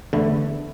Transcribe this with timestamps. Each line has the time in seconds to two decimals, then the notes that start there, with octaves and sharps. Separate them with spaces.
0.13 E2 D3 A3 E4